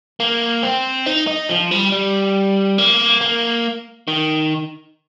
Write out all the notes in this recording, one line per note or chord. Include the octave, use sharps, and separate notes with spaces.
A#3
C4
D#4
D#4
F3
G3
G3
A#3
A#3
D#3